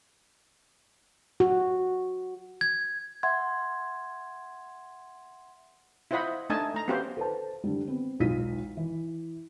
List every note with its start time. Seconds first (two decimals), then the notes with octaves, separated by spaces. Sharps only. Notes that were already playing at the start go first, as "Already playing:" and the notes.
1.40 F#4
2.61 G#6
3.23 E5 F#5 C6 G#6
6.11 E4 F4 C5 D#5 F#5 B5
6.50 A3 D4 D#4 D#5 G#5 A5
6.74 A3 A#5
6.88 B3 C#4 F#4 G4 C5 F5
7.17 A4 B4 C5 A5
7.64 D3 G3
7.87 B3 C4
8.19 E1 B1 D#4 F4 B6 D#7
8.77 E3